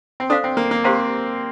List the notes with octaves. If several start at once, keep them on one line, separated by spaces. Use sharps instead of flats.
C4
D4 A4 C5 F5
C4
A#3
A#3
C4 G4 C5 F5 A#5